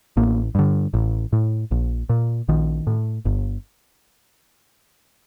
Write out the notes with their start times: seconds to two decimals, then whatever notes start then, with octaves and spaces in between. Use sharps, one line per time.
0.17 A1 A#3
0.55 G2 D3
0.94 A1
1.33 A2
1.71 A#1
2.09 A#2
2.48 A#1 D#3
2.87 A2
3.25 G1